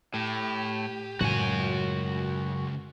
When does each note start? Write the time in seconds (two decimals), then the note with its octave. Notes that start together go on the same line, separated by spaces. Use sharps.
0.14 A2 G4
1.21 C#2 F#2 A2 F#4 G#5